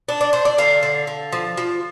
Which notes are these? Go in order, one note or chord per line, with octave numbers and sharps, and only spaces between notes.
D4
D5
D4 C5
D5
D3 F5
D3
D3
F3
F3